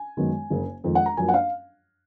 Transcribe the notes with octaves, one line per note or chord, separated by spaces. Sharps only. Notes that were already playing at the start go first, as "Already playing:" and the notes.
Already playing: G#5
F#2 D#3 G#3 B3
F#1 F#2 C#3 F#3 A#3
F2 D#3 G#3
F#5
A#5
F#2 F3 A#3 G#5
F#5
F5